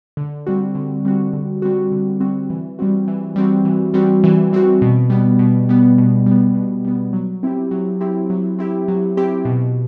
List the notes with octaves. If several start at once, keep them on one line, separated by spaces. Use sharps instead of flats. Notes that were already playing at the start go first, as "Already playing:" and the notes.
D3
G3 C4 F#4
D3
G3 C4 F#4
D3
G3 C4 F#4
D3
G3 C4 F#4
E3
G3 C4 F#4
E3
G3 C4 F#4
E3
G3 C4 F#4
E3
G3 C4 F#4
B2
G3 B3
B2
G3 B3
B2
G3
B3
B2
G3 B3
F#3
C4 E4 G4
F#3
C4 E4 G4
F#3
C4 E4 G4
F#3
C4 E4 G4
B2